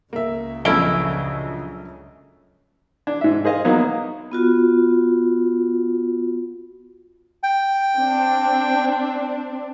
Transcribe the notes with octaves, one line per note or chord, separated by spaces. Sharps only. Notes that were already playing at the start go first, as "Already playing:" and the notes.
C#2 C#3 A#3 E5
A#1 F#2 C#4 E4 A4 D#5 D7 G7
D4
G#2 E5
G#4 C5 D#5 F5
F#3 A#3 B3 D#4
B3 F4 F#4
G5
C4 D4